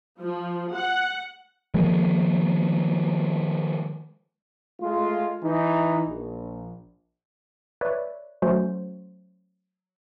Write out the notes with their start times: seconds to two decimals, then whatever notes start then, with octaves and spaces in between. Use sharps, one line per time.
0.21 F3
0.73 F#5
1.74 D#3 F3 G#3 A#3
4.80 G#3 A3 F4
5.42 E3 D#4
6.06 A#1
7.81 B4 C#5 D5 E5
8.42 F#3 A3 C#4 F#4 C5